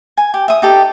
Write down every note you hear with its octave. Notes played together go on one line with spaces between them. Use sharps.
G#5
G4
E5 D#6
D#4 G4 A4